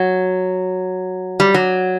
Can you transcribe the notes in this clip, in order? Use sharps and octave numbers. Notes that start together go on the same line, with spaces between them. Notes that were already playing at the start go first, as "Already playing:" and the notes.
Already playing: F#3
G3
F#3